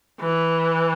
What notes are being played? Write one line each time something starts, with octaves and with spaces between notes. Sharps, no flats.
E3